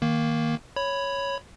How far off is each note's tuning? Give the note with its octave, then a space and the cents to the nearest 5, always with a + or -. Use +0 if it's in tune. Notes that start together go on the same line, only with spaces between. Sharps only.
D#3 +10 A#3 +0
C#5 +0 B5 +5